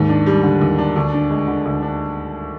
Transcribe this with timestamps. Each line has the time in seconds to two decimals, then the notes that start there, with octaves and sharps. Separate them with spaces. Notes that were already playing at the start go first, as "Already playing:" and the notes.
Already playing: D#2 G#2
0.09 D4
0.26 G3
0.43 D3
0.61 D#2
0.78 D4
0.96 D2
1.14 D4
1.31 G#3
1.48 D3
1.65 D2
1.83 D4